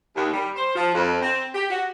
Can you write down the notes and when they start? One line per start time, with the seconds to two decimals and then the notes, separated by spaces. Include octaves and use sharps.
0.16 D#2
0.33 G3
0.56 C5
0.75 F3
0.95 F2
1.22 C4
1.54 G4
1.70 F#4